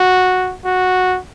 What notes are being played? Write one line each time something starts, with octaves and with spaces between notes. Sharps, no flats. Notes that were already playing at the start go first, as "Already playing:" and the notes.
Already playing: F#4
F#4